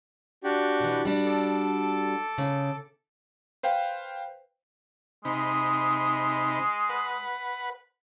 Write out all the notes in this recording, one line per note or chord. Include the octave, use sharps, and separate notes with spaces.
D4 F#4 G4
B2 E3
G3 D4 F#4
A4 D6
C#3
B4 C5 F5 G5
C3 G#3 D#4 B5
B4 F#5